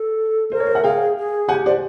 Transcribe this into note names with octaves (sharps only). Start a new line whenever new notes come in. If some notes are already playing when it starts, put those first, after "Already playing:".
Already playing: A4
A#4 C5
C#5
C5
E5 F#5
G#4 F5 G5
G#4
G4 F#5 G#5
C5 D5